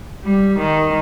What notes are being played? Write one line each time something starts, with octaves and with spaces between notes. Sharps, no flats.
G3
D#3